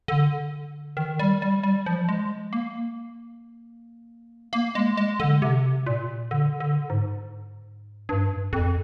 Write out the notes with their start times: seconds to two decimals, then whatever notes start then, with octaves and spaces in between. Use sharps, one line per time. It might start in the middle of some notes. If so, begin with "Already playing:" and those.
0.08 D3
0.97 D#3
1.19 G3
1.42 G3
1.63 G3
1.86 F3
2.09 G#3
2.53 A#3
4.53 A#3
4.75 G#3
4.97 G#3
5.20 D3
5.42 C3
5.86 A#2
6.31 D3
6.60 D3
6.90 G#2
8.09 G2
8.53 F2